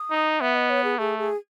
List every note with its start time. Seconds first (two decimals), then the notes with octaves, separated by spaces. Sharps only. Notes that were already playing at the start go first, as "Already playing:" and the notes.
Already playing: D#6
0.11 D#4
0.40 B3 E5
0.55 D#5
0.70 C#5
0.84 G#4
0.99 A3 G#4
1.19 G#4